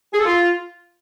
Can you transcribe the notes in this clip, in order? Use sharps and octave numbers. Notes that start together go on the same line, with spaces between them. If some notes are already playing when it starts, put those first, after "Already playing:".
G#4
A4
F4